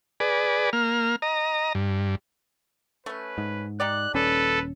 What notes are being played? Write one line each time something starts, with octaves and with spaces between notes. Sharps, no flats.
G#4 B4 D5
A#3 F6
D#5 A#5
G2
A3 C#4 B4
G#2
D#4 G4 D5 F#6
D#1 C#4 A4 B4